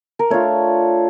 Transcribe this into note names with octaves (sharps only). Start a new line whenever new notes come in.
A#4
A3 D4 F4 C#5